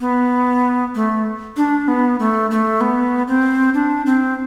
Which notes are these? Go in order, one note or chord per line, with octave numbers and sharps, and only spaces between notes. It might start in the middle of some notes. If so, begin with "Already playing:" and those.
B3
A3
D4
B3
A3
A3
B3
C4
D4
C4